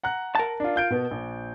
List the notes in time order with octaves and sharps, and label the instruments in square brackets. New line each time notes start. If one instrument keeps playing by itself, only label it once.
[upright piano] F#5 A#5 F#6
[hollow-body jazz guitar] A#4 A5
[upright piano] D4 F4
F4 G6 D7
B2 B3
A#1